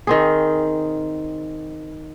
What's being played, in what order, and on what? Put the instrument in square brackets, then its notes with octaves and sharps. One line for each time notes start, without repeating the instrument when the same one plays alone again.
[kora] D#3 C4 G#4